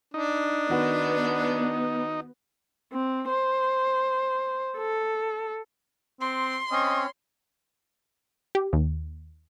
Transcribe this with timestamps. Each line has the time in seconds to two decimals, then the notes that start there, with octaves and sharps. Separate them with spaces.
0.14 D4 D#4
0.70 D#3 B3 F#4 B4
2.92 C4
3.29 C5
4.77 A4
6.21 C4 C6
6.71 C4 C#4 C#5 D#5
8.55 G4
8.73 D#2